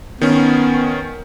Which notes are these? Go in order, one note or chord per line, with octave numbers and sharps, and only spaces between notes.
D#3 B3 C#4